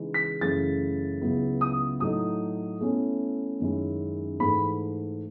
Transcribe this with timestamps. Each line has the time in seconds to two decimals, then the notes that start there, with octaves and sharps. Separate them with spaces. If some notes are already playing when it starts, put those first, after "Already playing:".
Already playing: C#3 E3 G#3 D#4
0.14 B6
0.41 F#2 C#3 E3 A3 E4 A6
1.21 C#2 C#3 F#3 B3 E4
1.61 D#6
2.00 A2 F#3 A3 D#4 D#6
2.81 B2 A3 C#4 E4
3.60 F#2 D#3 G#3 C#4 E4
4.40 G#2 E3 A3 B5